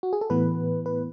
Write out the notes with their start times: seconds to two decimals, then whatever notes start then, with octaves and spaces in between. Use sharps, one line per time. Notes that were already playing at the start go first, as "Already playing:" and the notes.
0.03 F#4
0.13 G#4
0.21 A4
0.30 A2 E3 B3 B4
0.86 B4